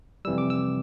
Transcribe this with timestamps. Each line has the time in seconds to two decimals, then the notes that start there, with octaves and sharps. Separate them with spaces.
0.25 F2 C3 E3 G3 E6
0.38 D6
0.50 E6